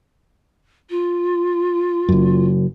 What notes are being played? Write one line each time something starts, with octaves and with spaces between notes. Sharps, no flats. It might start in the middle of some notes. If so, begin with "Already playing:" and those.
F4
F#1 F#2